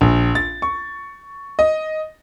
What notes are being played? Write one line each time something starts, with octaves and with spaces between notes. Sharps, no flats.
A#1
A6
C#6
D#5